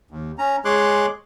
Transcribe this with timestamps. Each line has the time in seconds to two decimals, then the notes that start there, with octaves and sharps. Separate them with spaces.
0.11 D#2
0.38 C#4 A#5
0.65 G#3 G#4 C#5 C6 D6 F#6